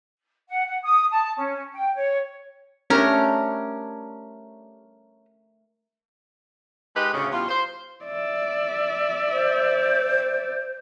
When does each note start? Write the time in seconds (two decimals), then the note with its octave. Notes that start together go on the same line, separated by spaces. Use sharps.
0.49 F#5
0.65 F#5
0.83 D#6
1.11 A5
1.38 C#4
1.73 G5
1.95 C#5
2.90 G3 A3 C#4 D4 A#4
6.95 G#3 D#4 G4 B4
7.13 D2 A2 C#3
7.31 E2 G3 F4
7.48 C5
8.05 D5 E5
9.32 C5